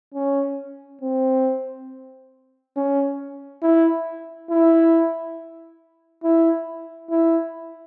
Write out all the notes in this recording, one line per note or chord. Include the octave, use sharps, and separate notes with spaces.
C#4
C4
C#4
E4
E4
E4
E4